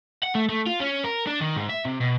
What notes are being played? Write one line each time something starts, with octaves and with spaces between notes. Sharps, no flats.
F#5
A3
A3
F4
C#4
A#4
D4
D#3
G#2
E5
C3
B2